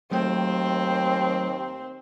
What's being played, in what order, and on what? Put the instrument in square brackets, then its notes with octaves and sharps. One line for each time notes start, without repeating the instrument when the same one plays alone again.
[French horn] D#2 [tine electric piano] F#3 A3 G5 [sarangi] C4